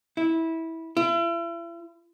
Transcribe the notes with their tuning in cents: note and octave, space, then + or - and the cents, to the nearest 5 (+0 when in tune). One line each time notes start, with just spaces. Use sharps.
E4 -15
E4 +40